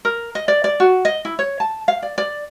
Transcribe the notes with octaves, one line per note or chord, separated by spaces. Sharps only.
A#4
D#5
D5
D5
F#4
D#5
E4
C#5
A5
F5
D5
D5